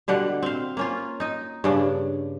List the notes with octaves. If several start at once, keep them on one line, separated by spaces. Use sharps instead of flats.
B2 D3 G3 F#5
C4 F5
A#3 C#4 F4
D#4 D#5
G2 C#3 D4